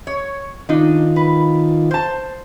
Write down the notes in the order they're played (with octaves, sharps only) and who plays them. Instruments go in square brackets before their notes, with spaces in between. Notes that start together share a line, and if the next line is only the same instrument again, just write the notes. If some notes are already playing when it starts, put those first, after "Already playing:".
[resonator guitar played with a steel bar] C#5
[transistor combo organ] D#3 F4 [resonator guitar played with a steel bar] D4 D#4
[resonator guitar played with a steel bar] B4
C5 A5